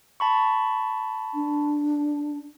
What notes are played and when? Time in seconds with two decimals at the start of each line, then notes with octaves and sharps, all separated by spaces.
0.20 A5 B5 C#6
1.34 D4